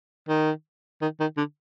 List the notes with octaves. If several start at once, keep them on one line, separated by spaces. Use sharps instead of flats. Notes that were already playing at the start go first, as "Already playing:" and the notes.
D#3
D#3
D#3
D3